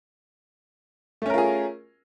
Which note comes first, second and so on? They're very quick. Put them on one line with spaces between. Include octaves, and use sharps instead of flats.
A3 C#4 A#4 F4 G#4